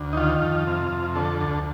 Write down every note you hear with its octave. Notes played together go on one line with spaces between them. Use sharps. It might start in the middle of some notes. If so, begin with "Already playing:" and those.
Already playing: D2
D#4
D#3 F4
F2
C3
F2
D3 A4
D2